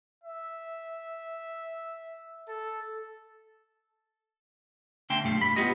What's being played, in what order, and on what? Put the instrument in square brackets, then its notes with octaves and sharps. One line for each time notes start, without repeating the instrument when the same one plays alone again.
[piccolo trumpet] E5
A4
[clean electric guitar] D3 A3 G5 A5 C6
B1 G2 A3 F5
B5
G3 B3 E4 F4 G4 D#5